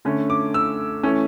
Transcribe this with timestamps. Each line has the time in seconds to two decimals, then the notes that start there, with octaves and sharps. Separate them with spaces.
0.05 D3 A3 C#4
0.30 D6
0.54 E6
1.03 E3 A3 C#4